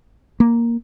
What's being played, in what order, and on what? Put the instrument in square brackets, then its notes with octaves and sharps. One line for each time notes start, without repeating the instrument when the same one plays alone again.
[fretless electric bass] A#3